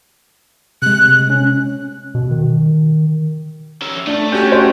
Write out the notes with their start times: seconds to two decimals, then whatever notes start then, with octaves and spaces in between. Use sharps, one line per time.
0.82 C3 G#3 F#6
1.30 C#4
2.15 B2
2.31 D#3
3.82 C#4 E5
4.07 A3 D4
4.32 C#4 F#4 G4 G6
4.52 C5